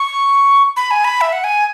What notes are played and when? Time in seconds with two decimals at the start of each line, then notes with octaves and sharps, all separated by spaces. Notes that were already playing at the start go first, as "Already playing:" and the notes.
Already playing: C#6
0.76 B5
0.91 G#5
1.04 B5
1.21 E5
1.33 F#5
1.44 G#5